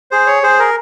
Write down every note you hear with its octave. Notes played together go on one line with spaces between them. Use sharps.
G#4 C5
C#5
G#4 C5
A#4